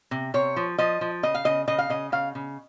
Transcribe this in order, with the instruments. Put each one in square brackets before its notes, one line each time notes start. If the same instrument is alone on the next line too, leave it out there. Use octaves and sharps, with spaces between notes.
[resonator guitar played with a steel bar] C3
C3 C#5
F3
F3 D#5
F3
C#3 D#5
F5
C#3 D#5
C#3 D#5
F5
C#3 D#5
C#3 F5
C#3